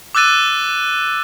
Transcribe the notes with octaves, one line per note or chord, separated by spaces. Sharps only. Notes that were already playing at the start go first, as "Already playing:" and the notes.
D6 E6 F#6 A6 D#7